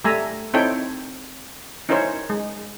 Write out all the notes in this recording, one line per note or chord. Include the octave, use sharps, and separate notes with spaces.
G3 A3 E5 G#5 A#5
C4 D#4 E4 A4 C#5 G5
C#4 D#4 E4 A#4 C5 C#5
G#3